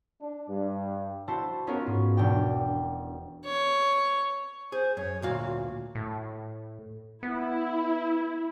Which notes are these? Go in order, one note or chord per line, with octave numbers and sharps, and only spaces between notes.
D4
G2
E4 F#4 C5 A5
B3 C#4 D#4 F4 F#4 A#4
G#2
E1 D4 G5
C#5
G#4 C5
F#2 C#5
D2 A#2 F#4 F5
A2
B3 E4